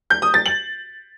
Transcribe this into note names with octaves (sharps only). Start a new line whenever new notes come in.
G6
D#6
A6
F#7